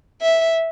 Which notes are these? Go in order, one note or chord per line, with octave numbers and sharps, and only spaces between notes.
E5